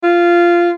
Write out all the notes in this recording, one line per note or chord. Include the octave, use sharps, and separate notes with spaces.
F4